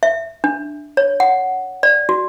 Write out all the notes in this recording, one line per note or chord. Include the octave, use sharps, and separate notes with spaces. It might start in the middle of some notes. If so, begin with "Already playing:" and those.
E5
D4
C#5
F#5
D5
F#4